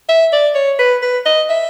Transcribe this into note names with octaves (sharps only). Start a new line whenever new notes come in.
E5
D5
C#5
B4
B4
D#5
E5